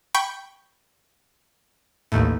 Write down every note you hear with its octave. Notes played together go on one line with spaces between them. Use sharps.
G5 B5 C#6
A1 D#2 A2